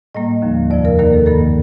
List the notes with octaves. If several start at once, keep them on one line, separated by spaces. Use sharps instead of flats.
A2 G3 A#3 D#5
D#2 D3 F3
F2 C3 F3 D5
A#4
D#2 D#3 A#3 A#4
A4
G2 D#3 A#3 A4